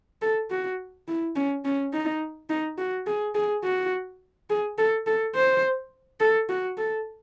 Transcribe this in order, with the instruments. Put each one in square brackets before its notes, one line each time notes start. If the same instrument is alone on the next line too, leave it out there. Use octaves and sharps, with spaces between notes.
[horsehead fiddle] A4
F#4
E4
C#4
C#4
D#4
D#4
F#4
G#4
G#4
F#4
G#4
A4
A4
C5
A4
F#4
A4